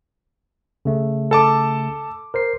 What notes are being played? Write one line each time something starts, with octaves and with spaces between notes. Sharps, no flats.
C#3 A3
A4 A5 D6
A#4 C5 C7